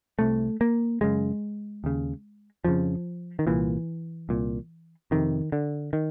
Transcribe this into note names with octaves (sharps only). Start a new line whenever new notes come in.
C2 C3 A3
A#3
F#2 C#3 G#3
D#2 C#3
F2 C#3 F3
D#3
C2 A#2 E3
C2 A#2
F2 C3 D#3
D3
D#3